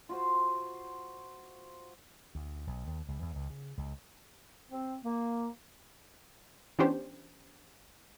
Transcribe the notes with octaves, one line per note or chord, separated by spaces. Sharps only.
F4 F#4 C5
D2
B1
D#2
C#2
E2
C#2
C#3
C#2
C4
A#3
E3 B3 C#4 D4 G4 C5